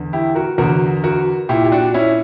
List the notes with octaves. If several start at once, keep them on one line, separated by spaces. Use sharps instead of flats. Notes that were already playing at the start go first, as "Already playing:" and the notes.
Already playing: E2 D3
E4 G4
F#4 A#4
E2 D3 F#4 A#4
F#4 A#4
A#2 E4 G4
G4
D4 F#4
C#4 E4